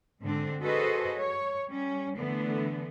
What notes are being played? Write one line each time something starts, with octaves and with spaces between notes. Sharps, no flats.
G#2 D3 C4 D4
F#4 G#4 A4 B4 C5 D#5
C#5
G3 C#4
D3 E3 A3 B3